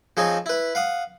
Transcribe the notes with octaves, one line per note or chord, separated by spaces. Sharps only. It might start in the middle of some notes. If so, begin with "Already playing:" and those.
F3 C4 D#4 G#4 C#5
E4 B4
F5 F#5 D#6